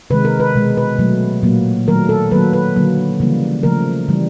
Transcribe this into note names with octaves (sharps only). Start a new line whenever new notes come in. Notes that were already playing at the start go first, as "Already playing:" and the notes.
C3 D#3 G#3 B4
A#4
B4
B2 G#3
B4
B2 F#3 A3
A#2 F#3 A#3
D#3 F#3 A3 A#4
A4
D#3 F#3 A#3 B4
B4
D3 F#3 A#3
C#3 E3 G3 A#3
C#3 F3 A3 A#4
C#3 E3 G3